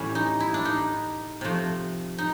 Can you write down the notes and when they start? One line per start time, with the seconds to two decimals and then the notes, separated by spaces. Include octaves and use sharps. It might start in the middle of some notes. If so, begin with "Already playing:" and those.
Already playing: A2 E3 G3 C#4
0.15 D#4
0.40 E4
0.54 D4
0.65 D#4
1.41 C3 F3 A3
2.18 D#4